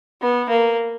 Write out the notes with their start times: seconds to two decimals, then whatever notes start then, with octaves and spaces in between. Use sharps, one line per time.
0.21 B3
0.49 A#3